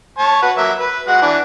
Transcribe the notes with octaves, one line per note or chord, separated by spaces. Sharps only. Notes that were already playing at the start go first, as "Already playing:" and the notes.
C#5 A5
F#4 B4
F#3 A#3 E5
B4
G#3 F#4 F#5
E3 D4